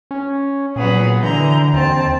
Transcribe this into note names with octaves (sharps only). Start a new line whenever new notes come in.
C#4
A#2 F#3 B3 G#4
D3 E3 A#5 G6
D#2 C4 A5